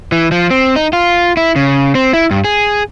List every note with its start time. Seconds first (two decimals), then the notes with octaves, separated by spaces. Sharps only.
0.12 E3
0.32 F3
0.50 C4
0.76 D#4
0.93 F4
1.37 E4
1.56 C#3
1.95 C4
2.13 E4
2.31 G2
2.44 G#4